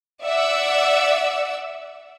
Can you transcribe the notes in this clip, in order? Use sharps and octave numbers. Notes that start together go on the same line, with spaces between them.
D5 E5 F#5 E6